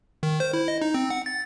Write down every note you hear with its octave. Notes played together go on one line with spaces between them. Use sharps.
D#3
C5
E4
D#5
D#4
C4
F#5
A6